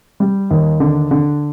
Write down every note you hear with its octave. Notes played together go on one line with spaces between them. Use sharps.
G3
D#2
D3
D3